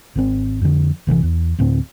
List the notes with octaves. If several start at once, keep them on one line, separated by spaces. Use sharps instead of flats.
G#1 B2 C4
F2 D3
A#1 C3 D#3 E3
E2
D2 A2 C4